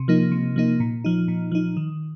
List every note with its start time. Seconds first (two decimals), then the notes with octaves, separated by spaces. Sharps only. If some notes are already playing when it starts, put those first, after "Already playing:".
Already playing: C3
0.08 F3 A#3 D#4
0.32 C3
0.56 F3 A#3 D#4
0.80 A#2
1.05 F3 D#4
1.28 A#2
1.52 F3 D#4
1.77 D#3